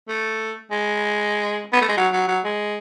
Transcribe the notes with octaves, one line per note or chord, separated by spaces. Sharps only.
A3
G#3
B3
A3
G#3
F#3
F#3
F#3
G#3